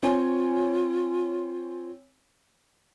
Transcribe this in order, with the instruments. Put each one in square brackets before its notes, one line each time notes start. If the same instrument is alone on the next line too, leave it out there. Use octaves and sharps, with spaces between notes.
[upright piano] C4 C#5 G#5 [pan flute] F4